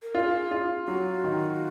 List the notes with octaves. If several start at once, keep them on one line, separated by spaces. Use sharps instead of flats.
A#4
F4 G#4 A#4
F4
F#3 F#4
D#3